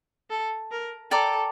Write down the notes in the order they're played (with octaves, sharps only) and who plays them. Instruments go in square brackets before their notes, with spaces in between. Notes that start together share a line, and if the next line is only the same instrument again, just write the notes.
[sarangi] A4
A#4
[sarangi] A4 [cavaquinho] D5 G5 A#5 D6